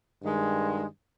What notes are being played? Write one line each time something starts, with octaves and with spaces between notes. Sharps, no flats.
G2 D#3 G#3